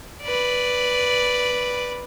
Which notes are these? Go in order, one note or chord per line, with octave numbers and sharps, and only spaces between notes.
B4 D5